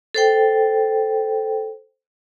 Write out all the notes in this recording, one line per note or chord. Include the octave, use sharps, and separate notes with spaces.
A4 C5 G5